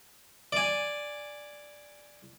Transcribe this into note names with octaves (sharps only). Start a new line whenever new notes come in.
D5 G#5